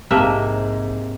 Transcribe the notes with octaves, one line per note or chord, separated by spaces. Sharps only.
A#1 G#2 C3 A#3 C4 E5 F5 A5